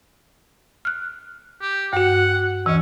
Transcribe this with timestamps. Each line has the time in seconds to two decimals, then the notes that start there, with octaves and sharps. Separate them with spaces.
0.85 F6 F#6
1.61 G4
1.93 G2 F#4 F#5
2.66 D#2 E3 C#4